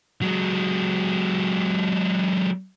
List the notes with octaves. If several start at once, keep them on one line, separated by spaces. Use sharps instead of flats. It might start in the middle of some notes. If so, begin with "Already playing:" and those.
F#3 G#3